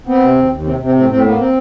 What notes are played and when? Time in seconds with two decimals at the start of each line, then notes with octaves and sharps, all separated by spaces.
0.07 B3 C4
0.21 C3
0.36 D#2
0.50 D#2
0.65 C3 C4
0.80 C3 C4
0.95 A2 C4
1.09 A2 C4
1.24 A#3 B3
1.39 C4